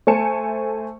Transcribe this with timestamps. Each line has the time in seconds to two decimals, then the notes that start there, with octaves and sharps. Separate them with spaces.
0.07 A3 C5 G#5 A5 C#7 E7